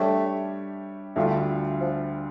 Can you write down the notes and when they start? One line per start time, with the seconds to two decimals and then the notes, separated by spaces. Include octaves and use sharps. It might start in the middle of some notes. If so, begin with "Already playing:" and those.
Already playing: G3 A3 D4 G4 C#5 E5
1.16 D2 D3 G3 A3 D4 F4
1.81 F3